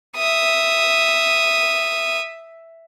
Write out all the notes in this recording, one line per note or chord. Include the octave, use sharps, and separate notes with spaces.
E5 D#6